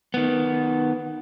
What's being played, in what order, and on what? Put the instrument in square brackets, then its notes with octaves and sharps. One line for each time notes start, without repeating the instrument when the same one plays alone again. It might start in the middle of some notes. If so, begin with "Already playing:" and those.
[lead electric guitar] D#3 B3